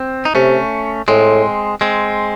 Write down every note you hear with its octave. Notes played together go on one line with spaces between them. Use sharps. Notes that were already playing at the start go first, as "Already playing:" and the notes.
Already playing: C4
D#4
C3 A3 C#4
A2 G#3 C4
G#3 C4